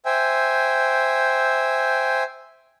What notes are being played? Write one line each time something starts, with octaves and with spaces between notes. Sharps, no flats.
C5 E5 G5 G#5